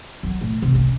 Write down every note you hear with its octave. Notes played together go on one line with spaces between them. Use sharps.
F#3
A2
C3
C#4